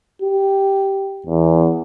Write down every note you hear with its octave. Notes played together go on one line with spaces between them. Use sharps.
G4
E2